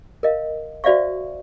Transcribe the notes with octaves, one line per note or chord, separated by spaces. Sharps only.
A#4 D#5 F5
F#4 C5 D5 E5 F5 C#6